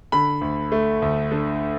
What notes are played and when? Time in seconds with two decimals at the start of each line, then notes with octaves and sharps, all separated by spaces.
0.12 D3 B5
0.41 D2
0.72 A3
1.02 D2
1.31 D3